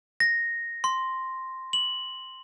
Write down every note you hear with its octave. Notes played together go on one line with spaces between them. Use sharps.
A#6
C6
F#7